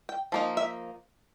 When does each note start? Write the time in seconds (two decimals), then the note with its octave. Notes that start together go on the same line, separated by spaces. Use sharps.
0.09 G5
0.32 F3 A#3 D#4
0.57 E5